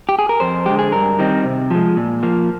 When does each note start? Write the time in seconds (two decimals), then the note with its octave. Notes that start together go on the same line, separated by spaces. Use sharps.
0.09 G4
0.19 G#4
0.29 A#4
0.40 F2 C5
0.66 D3 G#3 G4
0.79 G#4
0.92 G2 A#4
1.19 D#3 G3 C4 D#4
1.45 C3
1.71 F3 G#3
1.97 A#2
2.23 F3 A#3